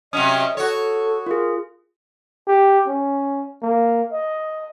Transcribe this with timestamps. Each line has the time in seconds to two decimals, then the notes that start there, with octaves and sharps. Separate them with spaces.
0.13 C3 F#3 C#4 D#5 D#6
0.57 F#4 A4 C#5
1.27 F4 G#4 A#4
2.47 G4
2.88 C#4
3.62 A#3
4.12 D#5